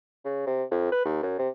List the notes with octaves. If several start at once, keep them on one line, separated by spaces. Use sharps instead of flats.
C#3
C3
F2
B4
D#2
F#2
C3